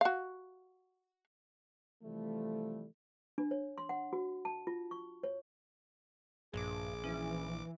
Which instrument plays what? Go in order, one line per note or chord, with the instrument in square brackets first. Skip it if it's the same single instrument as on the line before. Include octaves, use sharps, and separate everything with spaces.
[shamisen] F#4 F5
[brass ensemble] C3 E3 F3 G3 A3
[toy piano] D4
C#5
C6
F#5
F#4
A5
F4
C#6
C#5
[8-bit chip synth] A#1 D6 [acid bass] G2 [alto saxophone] G#4
[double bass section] E3 [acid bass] C#4